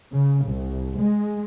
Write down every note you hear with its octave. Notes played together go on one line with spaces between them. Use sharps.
C#3
C2
G#3